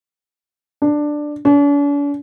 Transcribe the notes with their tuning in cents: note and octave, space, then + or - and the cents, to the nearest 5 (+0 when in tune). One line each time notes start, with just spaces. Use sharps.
D4 +10
D4 -45